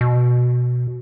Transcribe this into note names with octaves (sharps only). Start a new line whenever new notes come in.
B2